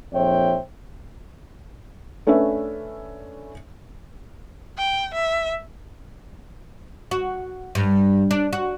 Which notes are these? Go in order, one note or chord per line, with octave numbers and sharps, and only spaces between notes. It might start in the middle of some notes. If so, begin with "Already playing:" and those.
A#1 F2 C5 C#5 E5 G5
A3 C#4 D4 B4 E5
G5
E5
F#4
G2
D4
F#4